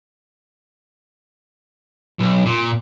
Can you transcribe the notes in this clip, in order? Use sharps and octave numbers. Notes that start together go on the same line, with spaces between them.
B1
A#2